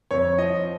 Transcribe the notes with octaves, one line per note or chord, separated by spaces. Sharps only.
F2 C#5
F3 D#5